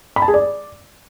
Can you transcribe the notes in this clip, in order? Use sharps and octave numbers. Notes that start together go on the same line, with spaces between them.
B5
A5
G#4
D5